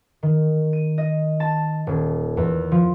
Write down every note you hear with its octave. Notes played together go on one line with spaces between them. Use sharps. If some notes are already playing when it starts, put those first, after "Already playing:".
D#3
D#7
D#5
A5
D#1
E2
F3